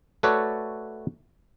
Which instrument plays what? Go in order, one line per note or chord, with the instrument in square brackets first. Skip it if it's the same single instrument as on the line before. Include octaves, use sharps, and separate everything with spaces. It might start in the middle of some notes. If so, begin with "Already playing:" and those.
[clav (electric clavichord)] A3 F#4 A4 B4 C#5 D5